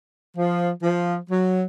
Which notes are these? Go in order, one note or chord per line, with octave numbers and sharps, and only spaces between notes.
F3
F3
F#3